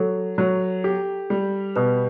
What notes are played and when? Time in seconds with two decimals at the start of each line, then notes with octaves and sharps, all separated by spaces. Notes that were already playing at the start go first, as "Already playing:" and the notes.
Already playing: F#3 A4
0.38 F#3
0.84 G4
1.30 G3
1.76 B2 B4